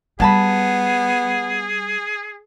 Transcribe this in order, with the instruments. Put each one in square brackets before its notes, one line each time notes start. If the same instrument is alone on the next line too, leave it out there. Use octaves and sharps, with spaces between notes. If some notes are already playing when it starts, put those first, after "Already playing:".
[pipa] F#3 A5 B5 [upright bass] G3 [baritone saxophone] B3 [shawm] G#4